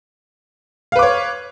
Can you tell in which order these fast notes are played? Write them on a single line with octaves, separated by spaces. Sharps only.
F5 B4 D6 C#5